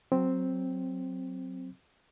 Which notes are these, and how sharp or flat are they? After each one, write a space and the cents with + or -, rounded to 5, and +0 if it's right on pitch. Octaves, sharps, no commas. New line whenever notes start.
F#3 +0 C4 +0